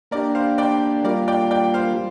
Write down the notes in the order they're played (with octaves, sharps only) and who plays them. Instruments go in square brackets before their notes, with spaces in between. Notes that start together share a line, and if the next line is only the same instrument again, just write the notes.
[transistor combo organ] A#3 D4 G4 [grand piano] A#4 D5
[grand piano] C5 F5
D5 G5
[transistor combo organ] G3 A#3 F4 [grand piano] A#4 D5
[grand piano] D5 G5
D5 G5
C5 F5